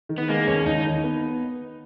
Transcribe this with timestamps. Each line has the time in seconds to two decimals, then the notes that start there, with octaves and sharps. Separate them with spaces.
0.09 D#3
0.18 B3
0.29 G#3 A#3
0.48 D#2 C#4
0.66 D#2 D#4
0.85 D#3
1.04 B3